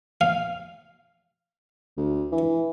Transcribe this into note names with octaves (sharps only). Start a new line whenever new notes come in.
F5
D2
E3